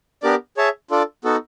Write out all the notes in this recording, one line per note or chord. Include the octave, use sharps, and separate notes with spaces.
B3 D4 G4 A#4 D5
G#4 C#5 E5 A5
D4 F4 A4 D5
B3 D#4 F#4 A4